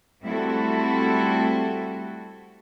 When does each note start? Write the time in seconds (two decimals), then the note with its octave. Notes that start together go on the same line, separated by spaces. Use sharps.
0.22 G3 A3 C4 E4 F#4 A4